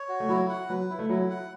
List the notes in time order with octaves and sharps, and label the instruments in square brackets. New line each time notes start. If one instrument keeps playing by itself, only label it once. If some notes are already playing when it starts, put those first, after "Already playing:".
Already playing: [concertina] C#5
F#4
[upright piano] A3
[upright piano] F#3 [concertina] E4
[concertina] F#5
[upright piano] F#3 [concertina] B4
[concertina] E4
[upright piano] A3
[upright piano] F#3 [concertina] E4
[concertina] F#5